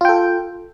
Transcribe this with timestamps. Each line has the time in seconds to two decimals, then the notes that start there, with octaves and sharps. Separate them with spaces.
0.01 F4
0.05 G5
0.09 A4